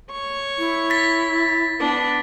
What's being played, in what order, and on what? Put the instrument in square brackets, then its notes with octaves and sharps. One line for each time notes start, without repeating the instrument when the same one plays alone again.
[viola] C#5 C#6
[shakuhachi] E4
[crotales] A6 B6
[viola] B3 D4